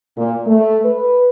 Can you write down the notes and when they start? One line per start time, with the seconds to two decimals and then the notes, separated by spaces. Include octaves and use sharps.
0.17 A#2
0.47 A3
0.85 B4